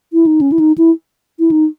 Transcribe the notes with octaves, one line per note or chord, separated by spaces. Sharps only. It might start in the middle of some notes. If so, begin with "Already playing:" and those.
E4
D#4
C#4
E4
D#4
E4
E4
D#4